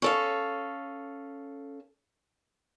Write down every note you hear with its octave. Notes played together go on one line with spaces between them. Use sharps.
C#4 A4 F5